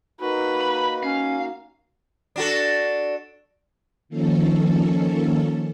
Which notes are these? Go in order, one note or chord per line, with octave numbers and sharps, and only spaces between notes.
A#3 D#4 F#4 B4
B5
C#4 F5
D4 F#4 A4
D#3 F3 A#3 C#4 A4